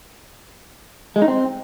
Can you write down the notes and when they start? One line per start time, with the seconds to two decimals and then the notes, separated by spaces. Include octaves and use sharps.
1.16 G#3
1.22 D#4
1.28 C4